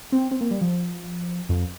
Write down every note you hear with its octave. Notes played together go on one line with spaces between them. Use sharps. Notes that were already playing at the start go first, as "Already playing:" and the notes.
C4
C4
A#3
G3
F3
F2